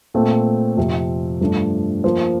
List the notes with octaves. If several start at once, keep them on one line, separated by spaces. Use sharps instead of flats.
A#2 A3 C4
F2 C3 F3
G2 F3 A3 D4
F3 A#3 F4 C5